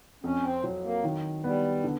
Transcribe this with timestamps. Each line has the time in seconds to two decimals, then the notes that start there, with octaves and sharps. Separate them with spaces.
0.24 F2 C#4
0.43 C4
0.64 F#3
0.84 A#3
1.04 D#3
1.44 G3 B3
1.84 D3